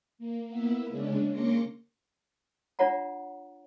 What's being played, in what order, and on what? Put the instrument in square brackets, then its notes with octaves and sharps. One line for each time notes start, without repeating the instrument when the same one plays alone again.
[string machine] A#3
A#3 B3 E4 E5
C#3 G#3 C#4 D4
A#3 C#4 C6 D6 A#6 C#7
[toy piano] D4 F4 C#5 F#5 A#5